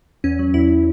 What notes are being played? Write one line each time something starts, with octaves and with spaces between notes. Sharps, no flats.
E2 C#4
F#3
E2 E4